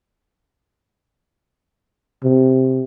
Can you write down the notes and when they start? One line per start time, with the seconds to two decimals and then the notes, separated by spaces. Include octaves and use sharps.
2.23 C3